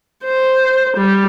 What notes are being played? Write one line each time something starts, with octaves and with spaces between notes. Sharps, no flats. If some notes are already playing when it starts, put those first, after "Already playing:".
C5
G3